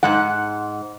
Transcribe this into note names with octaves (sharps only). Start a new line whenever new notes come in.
G#2 G#3 F#5